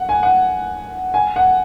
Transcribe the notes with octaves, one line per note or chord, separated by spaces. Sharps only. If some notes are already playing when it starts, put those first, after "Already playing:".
Already playing: F#5
G#5
F#5
G#5
F#5